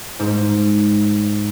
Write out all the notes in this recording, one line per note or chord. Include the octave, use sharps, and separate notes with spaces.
G#2